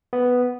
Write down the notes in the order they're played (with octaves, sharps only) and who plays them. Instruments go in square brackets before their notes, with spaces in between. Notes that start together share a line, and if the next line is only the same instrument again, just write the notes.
[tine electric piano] B3